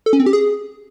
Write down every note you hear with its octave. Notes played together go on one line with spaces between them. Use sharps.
A4
C#4
C4
G4
G#4